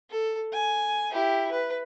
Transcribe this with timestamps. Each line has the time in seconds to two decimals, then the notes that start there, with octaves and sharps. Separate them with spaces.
0.10 A4
0.53 G#5
1.11 E4 G4
1.51 B4